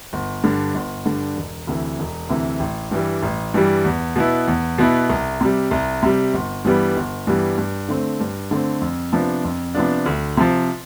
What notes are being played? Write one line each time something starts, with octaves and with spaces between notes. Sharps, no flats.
G1
G2 D3
G1
G2 D3
E1
D2 C3 E3
E1
D2 C3 E3
A1
G2 E3 G3
A1
G2 E3 G3
E2
B2 B3 E4
E2
B2 B3 E4
C2
C3 G3
C2
C3 G3
G1
G2 E3 G3 B3
G1
G2 E3 G3 B3
G2
D3 A3 C4
G2
D3 A3 C4
F2
C3 F3 B3 D4
F2
C3 F3 B3 D4
D2
C3 F3